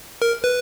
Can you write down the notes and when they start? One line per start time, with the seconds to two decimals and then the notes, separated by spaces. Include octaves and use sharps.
0.22 A#4
0.44 B4